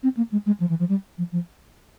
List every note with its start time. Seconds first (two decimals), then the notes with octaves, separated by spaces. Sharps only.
0.03 C4
0.17 A#3
0.32 G#3
0.46 G#3
0.60 F3
0.69 E3
0.79 F3
0.89 G3
1.18 F3
1.32 F3